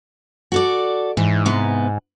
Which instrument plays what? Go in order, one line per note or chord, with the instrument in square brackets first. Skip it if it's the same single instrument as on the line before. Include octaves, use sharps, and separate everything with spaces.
[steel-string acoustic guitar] F#4 A4 D5
[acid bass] G#2 [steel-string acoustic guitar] E3
[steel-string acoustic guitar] C3 B3